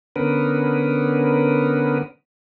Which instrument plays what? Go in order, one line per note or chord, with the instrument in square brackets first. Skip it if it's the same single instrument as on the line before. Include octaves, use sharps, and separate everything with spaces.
[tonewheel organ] D3 B3 C#4 A#4 B4